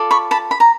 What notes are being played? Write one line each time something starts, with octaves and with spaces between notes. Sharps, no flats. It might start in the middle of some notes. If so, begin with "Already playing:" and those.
Already playing: F4 A4 D5
B5 C#6
A5 B5
B5
A#5